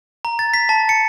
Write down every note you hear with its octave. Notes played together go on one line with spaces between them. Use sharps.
A#5
A6
B6
A5
C#7